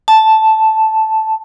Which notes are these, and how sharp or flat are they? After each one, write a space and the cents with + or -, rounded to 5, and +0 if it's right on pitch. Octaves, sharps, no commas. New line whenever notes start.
A5 -5